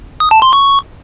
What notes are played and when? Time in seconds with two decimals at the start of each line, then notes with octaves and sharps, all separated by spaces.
0.20 D#6
0.31 A5
0.42 C6
0.53 C#6